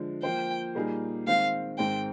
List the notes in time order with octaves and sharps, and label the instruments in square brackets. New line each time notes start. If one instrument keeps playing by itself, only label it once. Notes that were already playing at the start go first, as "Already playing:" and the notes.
Already playing: [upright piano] D3 F3 G#3
[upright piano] F3 A#3 F4 C5 [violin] G5
[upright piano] A#2 G3 A#3 D#4 G#4
[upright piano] D#3 G#3 C4 [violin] F5
[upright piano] G#2 D#3 G#3 C4 [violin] G5